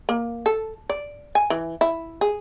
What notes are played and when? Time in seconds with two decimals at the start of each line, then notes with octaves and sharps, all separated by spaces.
0.09 A#3
0.46 A4
0.89 D5
1.35 G#5
1.50 E3
1.81 E4
2.21 G#4